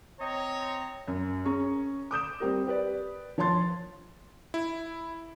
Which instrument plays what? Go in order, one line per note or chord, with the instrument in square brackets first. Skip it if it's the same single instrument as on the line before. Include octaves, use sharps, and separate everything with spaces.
[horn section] C4 D#5 A#5 [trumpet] C#5
[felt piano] F#2
C#4 G#4 A#5 C#6
D6 D#6 G6 E7
G3 C4 G4 A#4
G4 B4 D5
F3 C#5 A5 C6 A6
[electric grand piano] E4